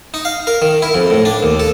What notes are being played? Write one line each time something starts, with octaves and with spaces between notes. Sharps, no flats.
D#4
F5
A#4
D#3
E4
F2
A2
D4
D#2
A4